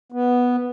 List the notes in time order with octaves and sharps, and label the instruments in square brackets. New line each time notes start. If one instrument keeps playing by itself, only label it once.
[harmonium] B3